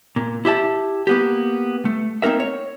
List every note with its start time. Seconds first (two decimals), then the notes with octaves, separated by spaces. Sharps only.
0.16 A#2
0.45 E4 G4 E5 A5
1.07 A#3 B3 G4
1.85 A3
2.22 A#3 C4 D#4 A#4 E5
2.40 C#5